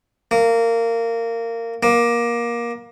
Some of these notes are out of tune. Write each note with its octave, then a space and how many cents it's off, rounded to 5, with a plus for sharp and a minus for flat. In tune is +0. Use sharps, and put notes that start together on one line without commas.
A#3 -20
A#3 +20